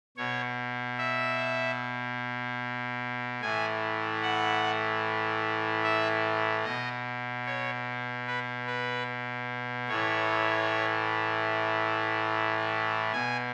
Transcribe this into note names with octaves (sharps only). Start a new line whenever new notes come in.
B2 C#5
E5
A2 E3 G#5
F#5
E5
B2 D#5
C#5
B4
B4
A2 E3 C#5
B2 G#5